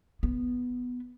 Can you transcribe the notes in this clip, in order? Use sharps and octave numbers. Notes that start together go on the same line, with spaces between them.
B3